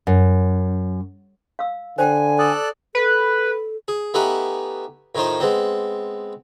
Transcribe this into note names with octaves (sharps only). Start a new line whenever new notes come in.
F#2
F5 E6
D3 C5 G5 G#5
A4 D5 D#6 F#6
A4 B4
G#4
A3 B3 D#4 G4 F#5 G#5
A2 D#3 D#4 F4 C5
G#3 B3 C4